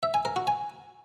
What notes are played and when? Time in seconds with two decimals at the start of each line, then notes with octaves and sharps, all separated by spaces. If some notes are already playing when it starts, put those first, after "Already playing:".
0.03 E5
0.14 G#5
0.25 A#4
0.36 F#4
0.47 G#5